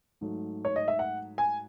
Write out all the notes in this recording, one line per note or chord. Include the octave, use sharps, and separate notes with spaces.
G#2 F#3 A3
C#5
D#5
E5
F#5
G#5